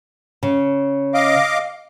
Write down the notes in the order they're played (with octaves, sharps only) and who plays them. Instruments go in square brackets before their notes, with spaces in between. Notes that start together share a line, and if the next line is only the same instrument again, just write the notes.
[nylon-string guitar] C#3
[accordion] D#5 F5 D6